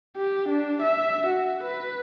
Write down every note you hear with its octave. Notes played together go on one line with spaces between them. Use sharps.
G4
D4
E5
F#4
B4